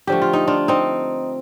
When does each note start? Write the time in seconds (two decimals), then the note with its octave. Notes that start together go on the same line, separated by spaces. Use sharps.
0.07 D3 F3 A3 G4
0.22 F4
0.33 D#4
0.47 D4 F4
0.68 C4 D#4